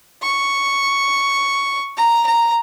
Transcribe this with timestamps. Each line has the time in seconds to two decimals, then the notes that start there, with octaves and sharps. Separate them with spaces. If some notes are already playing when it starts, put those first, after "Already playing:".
0.22 C#6
1.97 A#5
2.26 A#5